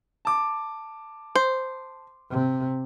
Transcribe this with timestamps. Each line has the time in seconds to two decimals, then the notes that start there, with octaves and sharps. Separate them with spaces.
0.25 A5 D6
1.35 C5
2.31 C3